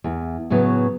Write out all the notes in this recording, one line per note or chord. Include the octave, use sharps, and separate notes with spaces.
E2
A2 C#3 F#3 B3